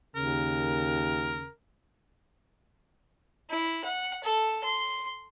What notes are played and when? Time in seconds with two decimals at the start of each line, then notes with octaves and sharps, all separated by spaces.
0.16 D#2 C#3 A#4
3.50 E4
3.84 F#5
4.23 A4
4.63 C6